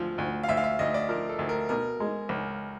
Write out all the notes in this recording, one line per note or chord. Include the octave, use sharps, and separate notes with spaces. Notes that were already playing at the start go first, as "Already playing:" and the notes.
Already playing: D2 F3
D2
F5
D2 E5
F5
E5
D2 D#5
D5
F3 A#4
A4
D2
A#4
B2 A#4
G#3
C#2